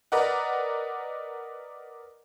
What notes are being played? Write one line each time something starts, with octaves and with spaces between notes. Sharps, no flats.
A#4 B4 D5 D#5 F#5